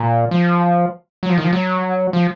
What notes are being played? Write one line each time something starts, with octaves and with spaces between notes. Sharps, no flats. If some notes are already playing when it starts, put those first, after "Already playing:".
Already playing: A#2
F3
F#3
F3
D#3
F3
F#3
F3